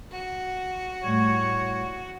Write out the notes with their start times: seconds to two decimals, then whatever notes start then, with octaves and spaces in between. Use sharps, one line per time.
0.11 F#4
1.04 A2 G3 C#5